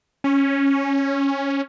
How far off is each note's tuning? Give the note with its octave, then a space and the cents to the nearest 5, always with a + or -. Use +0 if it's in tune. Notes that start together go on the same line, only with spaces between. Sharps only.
C#4 -5